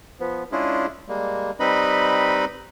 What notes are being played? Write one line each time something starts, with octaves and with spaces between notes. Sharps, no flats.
F3 B3
G#3 C#4 D4 E4 F4 G#4
G3 G#3 A#3
G3 C4 D#4 B4 D#5 B5